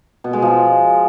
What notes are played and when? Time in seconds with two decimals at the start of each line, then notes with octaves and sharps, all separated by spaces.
0.24 B2
0.33 G#3
0.42 F3